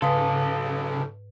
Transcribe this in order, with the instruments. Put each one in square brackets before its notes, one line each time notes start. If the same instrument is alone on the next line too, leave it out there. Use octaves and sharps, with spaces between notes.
[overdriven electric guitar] B1 A4 [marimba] G#2 B4 G#5 [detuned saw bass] C#3 [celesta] F5 D#6